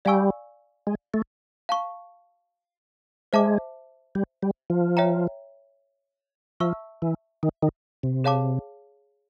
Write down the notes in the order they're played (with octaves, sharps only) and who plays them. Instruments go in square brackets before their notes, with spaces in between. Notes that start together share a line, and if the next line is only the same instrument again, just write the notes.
[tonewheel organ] G3 [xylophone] D5 F5 G#5 C#6 E6
[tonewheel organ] G#3
A3
[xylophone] F5 A5 C#6
[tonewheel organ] G#3 [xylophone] C5 E5 A5 D6
[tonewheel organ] G3
G3
F3
[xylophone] C#5 E5 G5 A#5
[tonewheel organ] F3 [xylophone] E5 A5 C#6 E6
[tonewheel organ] E3
D#3
D#3
C3
[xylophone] G#4 C#5 F5 A5 D6